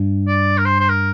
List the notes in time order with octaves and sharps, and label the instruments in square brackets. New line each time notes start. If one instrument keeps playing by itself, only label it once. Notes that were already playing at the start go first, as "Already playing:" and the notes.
Already playing: [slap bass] G2
[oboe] D5
A#4
C5
C5
A#4